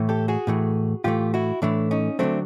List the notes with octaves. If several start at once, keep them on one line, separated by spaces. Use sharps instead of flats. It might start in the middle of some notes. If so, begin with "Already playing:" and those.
Already playing: A2 E3 A3
G4 A4
F#4 G#4
A2 E3 A3
A2 E3 A3 F4 G4
E4 F#4
A2 E3 A3 D4 E4
C#4 D#4
D3 F#3 A3 C4 D4